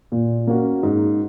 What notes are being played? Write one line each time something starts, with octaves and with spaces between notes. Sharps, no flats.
A#2
A#3 C#4 F#4
G#2